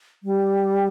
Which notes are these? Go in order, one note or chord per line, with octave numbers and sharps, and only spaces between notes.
G3